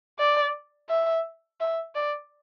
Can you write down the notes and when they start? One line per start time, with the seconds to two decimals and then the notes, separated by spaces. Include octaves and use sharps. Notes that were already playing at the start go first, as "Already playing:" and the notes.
0.19 D5
0.89 E5
1.60 E5
1.95 D5